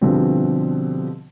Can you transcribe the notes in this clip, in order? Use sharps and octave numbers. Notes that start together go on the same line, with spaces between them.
B2 D3 F3 G3 C4